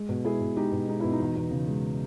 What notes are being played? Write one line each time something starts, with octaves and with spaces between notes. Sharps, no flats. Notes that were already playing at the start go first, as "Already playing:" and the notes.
Already playing: G#3
B2
G#3 E4 G#4
B2
G#3 D#4 G4
B2
G#3 D#4
B2 E4
D#4
E2
E2
C#3
G#3